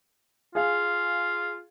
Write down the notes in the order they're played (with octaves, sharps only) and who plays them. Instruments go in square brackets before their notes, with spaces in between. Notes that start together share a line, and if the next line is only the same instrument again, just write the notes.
[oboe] F4 [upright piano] G#4 F5